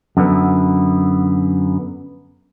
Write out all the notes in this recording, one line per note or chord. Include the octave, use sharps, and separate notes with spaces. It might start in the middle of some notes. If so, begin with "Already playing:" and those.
F#2 D3 B3